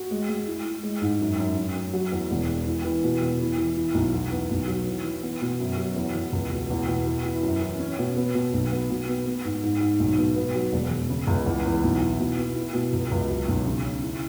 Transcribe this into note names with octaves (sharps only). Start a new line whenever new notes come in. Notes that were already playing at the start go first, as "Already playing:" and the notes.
Already playing: F#4
G#3
G#3
E4
E4
G#3
G#2
F#2
F#2
F#2
F#2
F#3
E2
E1
E3
E3
E3
B2
E1
E3
E3
E4
B1
E2
B3
B1
F#3
E3
E3
B3
B2
F#2
F#3
E2
E2
C#2
B2
E2
B2
E3
E4
F#2
E3
C#4
B2
B3
B2
B1
B3
B2
B3
B3
G#2
G#2
G#2
B1
B2
B3
F#3
E1
E1
C#3
C#2
E2
E2
B1
E4
B2
B3
E4
B2
C#2
C#2
F#3
B1
C#3
C#3
E4